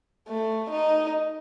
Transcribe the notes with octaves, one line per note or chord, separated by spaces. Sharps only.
A3
D#4